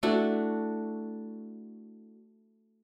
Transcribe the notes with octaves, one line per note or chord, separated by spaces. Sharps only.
A3 D4 E4 F#4